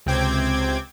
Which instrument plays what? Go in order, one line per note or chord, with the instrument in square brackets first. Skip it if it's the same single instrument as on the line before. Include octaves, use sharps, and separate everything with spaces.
[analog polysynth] C#2 C3 C4 G5 D6 G#6